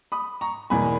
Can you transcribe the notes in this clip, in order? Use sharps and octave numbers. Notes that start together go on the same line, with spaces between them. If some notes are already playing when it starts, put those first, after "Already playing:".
B5 D#6
A#5 C#6
E2 B2 A#3 G#5 B5